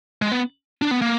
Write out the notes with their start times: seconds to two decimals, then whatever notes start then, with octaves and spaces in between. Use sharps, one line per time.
0.22 G#3
0.32 B3
0.82 D4
0.91 B3
1.02 A#3